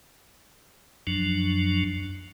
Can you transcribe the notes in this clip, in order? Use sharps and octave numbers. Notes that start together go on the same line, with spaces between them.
F#2 F3 F#3 D4